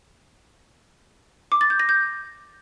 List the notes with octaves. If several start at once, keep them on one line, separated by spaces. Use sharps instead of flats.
D6
A6
G6
A#6
G6